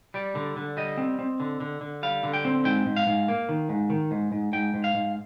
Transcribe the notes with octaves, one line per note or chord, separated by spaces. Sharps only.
G3 D5
D3
D3
G3 D#5
C4
C4
D3
D3
D3
G3 F5
D3
G5
C4
G#2 G5
G#2
F5
G#2
A#3
D#3
G#2
D#3
G#2
G#2
G#2 G5
G#2
F5
G#2